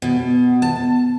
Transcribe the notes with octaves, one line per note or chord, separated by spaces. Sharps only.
B2
A5